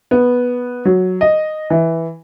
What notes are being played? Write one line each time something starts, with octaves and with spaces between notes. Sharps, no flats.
B3
F#3
D#5
E3